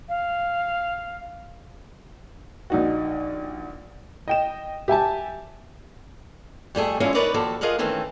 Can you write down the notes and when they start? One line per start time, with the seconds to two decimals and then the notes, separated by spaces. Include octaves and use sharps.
0.09 F5
2.70 A#1 D#4 F#4
4.28 D#5 G5 E7
4.88 G4 E5 G#5 A5
6.75 F2 G3 A3 G#4
7.00 E3 G#3 B3 C#4 E4 F4
7.15 B3 D#4 A#4 B4 C#5 D5
7.34 D#2 F3 F#4 A4
7.61 F4 G#4 A#4 D#5 F5 F#5
7.79 D#3 E3 A3 C4 C#4